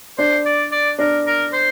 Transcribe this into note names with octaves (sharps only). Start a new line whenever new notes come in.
D4 C5
D5
D5
D4 A#4
A#4
C5